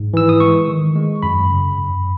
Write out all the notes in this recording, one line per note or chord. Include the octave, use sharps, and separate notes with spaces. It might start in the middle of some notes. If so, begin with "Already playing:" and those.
Already playing: G#2
E3 E6
D#6
G#3 C#6
D#3
G#3
F#2 B5
C#3
F#2